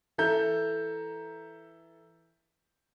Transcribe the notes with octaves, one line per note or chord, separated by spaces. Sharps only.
E3 A4 E5 A#5 G6